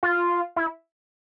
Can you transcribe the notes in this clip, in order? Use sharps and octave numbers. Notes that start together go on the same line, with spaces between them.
F4
E4